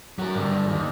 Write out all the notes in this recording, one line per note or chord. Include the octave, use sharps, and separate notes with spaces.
F#3 A#4
G2 D3
D#2